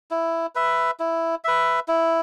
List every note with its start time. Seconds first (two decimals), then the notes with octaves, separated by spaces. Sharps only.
0.11 E4
0.55 B4 E5
1.00 E4
1.44 B4 E5
1.88 E4